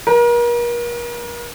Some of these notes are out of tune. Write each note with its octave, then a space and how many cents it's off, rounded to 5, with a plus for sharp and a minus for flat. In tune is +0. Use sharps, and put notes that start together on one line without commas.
A#4 +40